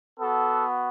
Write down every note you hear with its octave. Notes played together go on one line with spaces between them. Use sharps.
B3 F#4 A4